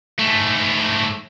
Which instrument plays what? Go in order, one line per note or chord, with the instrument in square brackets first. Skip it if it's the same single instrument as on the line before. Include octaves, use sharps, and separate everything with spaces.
[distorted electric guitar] G#2 A3